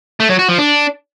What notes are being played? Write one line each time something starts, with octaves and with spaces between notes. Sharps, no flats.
A3
F#3
F#4
F3
D4